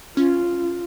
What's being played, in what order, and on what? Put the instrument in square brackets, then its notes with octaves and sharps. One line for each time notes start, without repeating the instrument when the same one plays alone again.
[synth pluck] C#4 [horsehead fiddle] F4